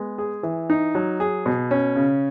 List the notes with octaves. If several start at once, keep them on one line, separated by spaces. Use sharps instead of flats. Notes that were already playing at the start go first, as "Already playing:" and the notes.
Already playing: G#3 B3
G#4
E3
D#4
F#3
G#4
B2
C#4
C#3